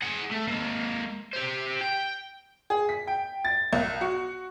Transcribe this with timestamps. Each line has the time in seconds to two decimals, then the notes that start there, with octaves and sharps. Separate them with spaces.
0.02 G#4 F#5
0.31 A3
0.48 G#3 A#3
1.33 G4 C5
1.81 G5
2.70 G#4
2.89 B6
3.07 G5
3.45 A6
3.73 B1
4.01 F#4